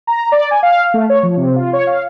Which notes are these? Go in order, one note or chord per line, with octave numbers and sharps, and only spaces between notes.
A#5
D5
G#5
F5
A3
C#5
F3
C3
F4
C#5
F5